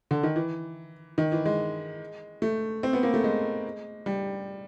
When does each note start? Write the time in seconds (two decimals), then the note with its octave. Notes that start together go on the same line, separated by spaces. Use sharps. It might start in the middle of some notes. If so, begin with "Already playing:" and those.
0.11 D3
0.23 D#3
0.36 E3
1.18 D#3
1.32 E3
1.46 G#3
2.42 A3
2.83 C4
2.93 B3
3.03 A#3
3.14 A3
3.24 G#3
4.06 G3